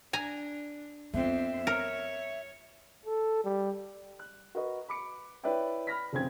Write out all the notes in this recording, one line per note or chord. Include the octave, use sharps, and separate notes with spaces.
D4 G#5 A#5
F2 B3 C4 E5
A#4 C#5
A4
G3
F#6
F#4 A#4 B4 D#5
B5 D6 C#7
E4 B4 C#5 D5 E5 G5
B5 F6 A#6 B6
F1 C#3 C4 G#6